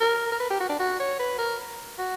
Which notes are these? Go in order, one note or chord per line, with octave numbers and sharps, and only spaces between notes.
A#4
A#4
B4
G4
F#4
D4
F#4
C#5
B4
A#4
F#4